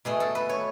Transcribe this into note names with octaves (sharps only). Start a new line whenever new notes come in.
B2 A3 G#4
A4
B4
C#5